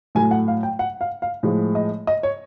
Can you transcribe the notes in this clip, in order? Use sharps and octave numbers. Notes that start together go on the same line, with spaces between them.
A2 F#3 A3 G#5
F#5
F5
G5
F#5
F5
F5
A2 F3 G#3
D#5
D#5
C#5